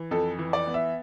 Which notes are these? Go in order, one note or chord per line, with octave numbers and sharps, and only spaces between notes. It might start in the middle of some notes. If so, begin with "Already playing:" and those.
Already playing: E3
F2 A4
E3
D5
B3
E5